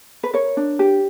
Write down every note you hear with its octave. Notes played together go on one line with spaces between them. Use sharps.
B4
A#4 C#5
D4
G4